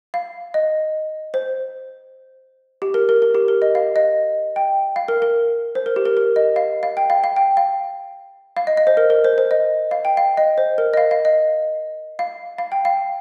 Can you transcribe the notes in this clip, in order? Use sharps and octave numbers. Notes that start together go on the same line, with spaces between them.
F5
D#5
C5
G4
A#4
A#4
A#4
G4
A#4
D#5
F5
D#5
G5
F5
A#4
A#4
C5
A#4
G4
A#4
A#4
D#5
F5
F5
G5
F5
F5
G5
F5
F5
D#5
D#5
C5
A#4
A#4
C5
C5
D#5
F5
G5
F5
D#5
C5
A#4
D#5
F5
F5
D#5
F5
F5
G5
F5